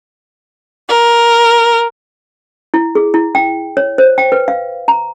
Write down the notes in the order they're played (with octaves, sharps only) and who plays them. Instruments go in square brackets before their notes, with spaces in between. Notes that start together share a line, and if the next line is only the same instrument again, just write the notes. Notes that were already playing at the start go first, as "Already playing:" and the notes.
[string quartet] A#4
[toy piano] E4
G#4
E4
G5
C#5
C5
G5
B4
F5
A#5